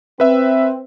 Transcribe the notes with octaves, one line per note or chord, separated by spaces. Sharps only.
C4 B4 E5